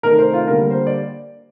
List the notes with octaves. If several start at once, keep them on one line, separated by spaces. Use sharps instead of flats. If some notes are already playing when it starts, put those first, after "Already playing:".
C3 D#3 A3 A#4
C5
F4
D3 G3 A#3 A#4
C5
D5